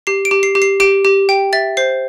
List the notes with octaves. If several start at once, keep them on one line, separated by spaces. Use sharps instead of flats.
G4 C7
D7
G4
C7
G4
C7
G4 D7
G4
G5
E5 A6
C5 C7